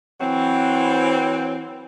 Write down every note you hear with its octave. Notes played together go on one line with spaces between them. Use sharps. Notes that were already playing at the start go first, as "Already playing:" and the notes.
E3 F#3 C4